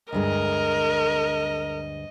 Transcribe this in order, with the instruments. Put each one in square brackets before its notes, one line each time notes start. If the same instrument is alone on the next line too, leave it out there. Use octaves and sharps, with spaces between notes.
[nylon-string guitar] D2 G2 G#3 [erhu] A#4 [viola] D#5